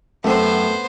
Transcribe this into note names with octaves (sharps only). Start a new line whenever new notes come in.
F#2 A3 B3 C4 C5